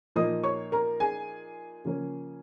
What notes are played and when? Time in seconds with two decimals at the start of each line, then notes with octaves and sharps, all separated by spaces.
0.16 A#2 F3 A#3 D#4 D#5 D#6
0.43 C#5 C#6
0.72 A#4 A#5
1.00 G#4 G#5
1.85 C#3 F3 A#3 C#4